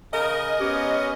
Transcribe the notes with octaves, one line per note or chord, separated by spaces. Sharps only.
C#3 A#4 D#5
B3 C#4 G4